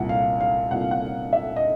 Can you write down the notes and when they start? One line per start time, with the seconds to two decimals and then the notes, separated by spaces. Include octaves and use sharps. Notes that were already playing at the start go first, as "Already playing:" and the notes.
Already playing: C2 A#2 F#5
0.09 F5
0.41 F5
0.71 C2 A#2 F#5
0.81 F5
0.91 F#5
1.01 F5
1.33 E5
1.56 D#5